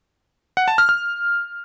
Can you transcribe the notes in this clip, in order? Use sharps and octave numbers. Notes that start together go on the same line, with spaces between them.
F#5
A5
F6
F6